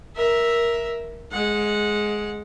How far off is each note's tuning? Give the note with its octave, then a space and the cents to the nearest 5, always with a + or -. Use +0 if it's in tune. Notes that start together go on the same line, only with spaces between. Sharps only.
A#4 +10 E5 +0
G#3 +10 F#5 -20